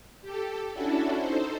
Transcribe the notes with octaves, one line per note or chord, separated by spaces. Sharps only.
G4 A4
C#4 D4 E4 F#4 A4
D#4 A4 C5